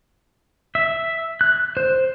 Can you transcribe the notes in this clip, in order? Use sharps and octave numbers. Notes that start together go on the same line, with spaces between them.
E5
F#6
C5